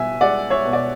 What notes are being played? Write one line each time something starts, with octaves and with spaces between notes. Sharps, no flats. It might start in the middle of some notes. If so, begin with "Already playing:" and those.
Already playing: B2 E5 G#5
G#3 D5 F#5
C#5 E5
B2
D5